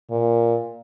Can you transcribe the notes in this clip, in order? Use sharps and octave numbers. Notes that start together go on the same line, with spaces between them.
A#2